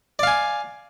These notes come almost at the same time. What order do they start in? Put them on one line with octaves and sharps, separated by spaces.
D5 F5 G#5